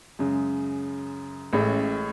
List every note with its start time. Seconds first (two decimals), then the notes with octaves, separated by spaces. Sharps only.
0.19 F#2 C#3 G#3
1.53 A1 A2 G#3 C#4